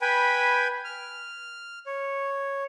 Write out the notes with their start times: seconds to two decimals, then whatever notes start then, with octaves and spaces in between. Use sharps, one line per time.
0.02 B4 G5 G#5 B5
0.84 F6
1.86 C#5